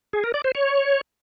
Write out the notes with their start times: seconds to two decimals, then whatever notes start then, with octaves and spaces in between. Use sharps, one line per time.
0.13 G#4
0.24 A#4
0.34 D5
0.44 C5
0.55 C#5